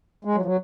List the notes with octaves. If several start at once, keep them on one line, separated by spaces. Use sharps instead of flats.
G#3
F#3
F3
F#3